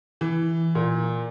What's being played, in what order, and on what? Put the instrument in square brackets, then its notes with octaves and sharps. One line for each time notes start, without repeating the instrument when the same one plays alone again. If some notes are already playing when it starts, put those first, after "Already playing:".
[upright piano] E3
A#2